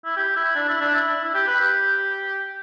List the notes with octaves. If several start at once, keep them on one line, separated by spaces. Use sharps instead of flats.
E4
G4
E4
D4
E4
D4
E4
E4
G4
B4
G4